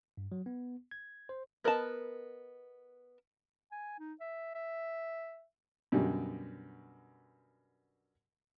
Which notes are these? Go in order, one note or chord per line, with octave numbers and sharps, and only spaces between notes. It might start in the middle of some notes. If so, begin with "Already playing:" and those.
G2
F#3
B3
G#6
C5
B3 A#4 B4 D#5 A5
G#5
D#4
E5
E5
F#2 B2 D3 G3